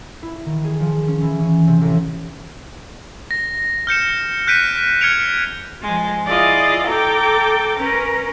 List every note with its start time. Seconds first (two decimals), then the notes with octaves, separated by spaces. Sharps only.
0.23 E4
0.46 D#3
0.64 G#4
0.80 F3
1.08 C#4
1.22 E3
1.41 C#4
1.67 C3
1.81 A1
3.31 A#6
3.87 F6 G6 C#7 E7
4.47 F#6 G6 B6 D7 D#7
5.01 F6 G#6 C#7 D7 F7
5.83 F3 G#3
6.26 E4 F4 G#4 D5 D#5
6.87 A4 G5 A#5 D6
7.76 C#4 A#4 B4